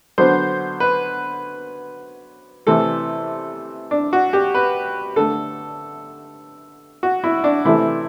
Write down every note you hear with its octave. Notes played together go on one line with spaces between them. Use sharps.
D3 F#3 B3 C5
B4
C3 E3 A3 A4
D4
F#4
G4
B4
D3 A3 A4
F#4
E4
D4
C3 E3 A3 E4